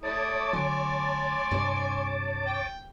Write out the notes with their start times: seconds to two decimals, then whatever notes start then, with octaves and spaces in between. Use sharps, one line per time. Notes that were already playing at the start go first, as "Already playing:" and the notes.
0.03 A3 E4 C#5 A5 D6 D#6
0.53 D3 F#3 G#5 C6
1.51 C2 G2 C3
2.46 G5